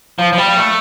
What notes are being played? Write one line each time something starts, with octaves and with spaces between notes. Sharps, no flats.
F3
F3
G3
A3